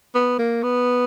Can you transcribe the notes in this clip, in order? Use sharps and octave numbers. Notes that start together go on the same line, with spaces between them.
B3
A#3
B3